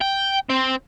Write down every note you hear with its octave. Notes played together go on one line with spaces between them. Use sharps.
G5
C4